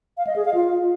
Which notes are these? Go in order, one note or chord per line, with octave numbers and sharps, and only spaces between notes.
F5
D#5
G#4
F5
F4